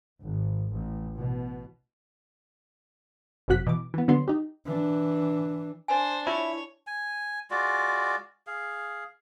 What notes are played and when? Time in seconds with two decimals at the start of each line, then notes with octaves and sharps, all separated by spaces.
0.23 G#1
0.73 A1
1.13 B2
3.48 G1 F#2 C3 F#4 F#6 B6
3.67 B2 E3 D6
3.94 E3 B3
4.08 D3 F#3 B3 C6
4.28 D#4 G4
4.66 E3 D4
5.88 D4 C5 G#5
6.27 E4 F4 C#5
6.87 G#5
7.51 G#3 F4 F#4 D5
8.47 G#4 F5